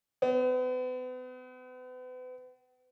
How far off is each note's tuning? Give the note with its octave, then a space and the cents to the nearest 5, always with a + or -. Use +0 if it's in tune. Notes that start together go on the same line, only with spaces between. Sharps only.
B3 +40